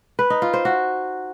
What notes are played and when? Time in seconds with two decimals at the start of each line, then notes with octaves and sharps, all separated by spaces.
0.19 B4
0.30 D#4
0.42 F4
0.53 C5
0.65 F#4